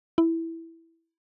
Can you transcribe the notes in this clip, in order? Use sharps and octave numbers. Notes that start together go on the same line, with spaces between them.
E4